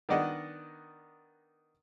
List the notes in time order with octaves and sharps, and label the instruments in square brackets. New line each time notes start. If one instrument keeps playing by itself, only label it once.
[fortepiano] D#3 B3 D4 D5 D#5 F#5